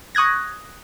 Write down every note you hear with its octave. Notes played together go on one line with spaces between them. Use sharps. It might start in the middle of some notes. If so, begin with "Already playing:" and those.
C#6 D#6 F#6 G#6 A#6